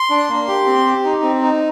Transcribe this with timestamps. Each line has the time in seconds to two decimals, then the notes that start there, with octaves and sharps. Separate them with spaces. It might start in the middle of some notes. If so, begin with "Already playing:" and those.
Already playing: C6
0.10 D4
0.29 A#3
0.48 G4
0.66 C4
0.85 G4
1.04 D#4
1.23 C4
1.42 D#4